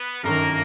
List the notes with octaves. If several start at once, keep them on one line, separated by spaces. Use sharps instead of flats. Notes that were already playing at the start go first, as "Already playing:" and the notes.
Already playing: B3 B4
G1 F#2 D#3 A#3 A#4